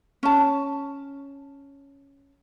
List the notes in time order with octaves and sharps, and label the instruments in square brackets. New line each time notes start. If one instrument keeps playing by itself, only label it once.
[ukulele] C#4 A5